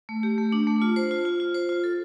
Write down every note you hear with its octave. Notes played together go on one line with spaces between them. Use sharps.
A3
G4
A3
D4
A3
F4
C5
F4
F4
F4
C5
F4
A4